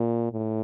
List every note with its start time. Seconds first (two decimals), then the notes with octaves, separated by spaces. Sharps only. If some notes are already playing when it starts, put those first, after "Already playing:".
Already playing: A#2
0.33 A2